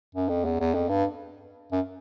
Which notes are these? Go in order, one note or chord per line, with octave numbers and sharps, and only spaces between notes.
F#2
F2
E2
E2
F2
G2
F#2